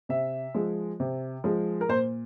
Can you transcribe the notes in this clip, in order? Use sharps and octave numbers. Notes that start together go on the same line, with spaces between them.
C3 E5
F3 G#3
C3
F3 G#3
A#4
A#2 C5